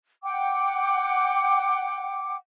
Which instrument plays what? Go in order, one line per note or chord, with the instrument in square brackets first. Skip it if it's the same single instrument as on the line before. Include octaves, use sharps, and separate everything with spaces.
[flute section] F#5 G5 D6